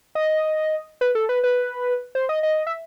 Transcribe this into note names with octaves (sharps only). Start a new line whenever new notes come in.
D#5
B4
A4
B4
B4
C5
D#5
D#5
E5